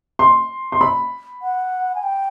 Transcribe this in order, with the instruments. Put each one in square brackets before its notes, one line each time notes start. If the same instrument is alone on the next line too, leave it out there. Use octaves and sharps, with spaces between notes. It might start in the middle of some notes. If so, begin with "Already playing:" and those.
[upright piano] C6
C6
B5
[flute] F#5
G#5
G5